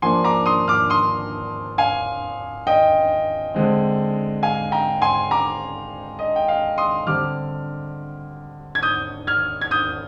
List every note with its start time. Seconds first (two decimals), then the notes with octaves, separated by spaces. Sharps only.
0.02 F3 A#3 D4 G#5 C6
0.24 A#5 D6
0.46 C6 D#6
0.68 D6 F6
0.90 C6 D#6
1.78 F5 G#5
2.67 D#5 G5
3.54 D3 G#3 C4
4.43 F5 G#5
4.72 G5 A#5
5.02 G#5 C6
5.31 A#5 D6
6.19 D#5
6.36 G5
6.48 F5
6.78 C6 D#6
7.07 D3 G3 C4 D6 F6
8.75 G#6
8.83 D#6 G6
9.27 F6 G#6
9.61 G#6
9.71 D#6 G6